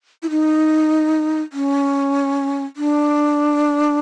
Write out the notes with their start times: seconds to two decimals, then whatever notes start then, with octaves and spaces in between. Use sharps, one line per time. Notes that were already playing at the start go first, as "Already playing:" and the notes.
0.23 E4
0.30 D#4
1.53 C#4
2.76 D4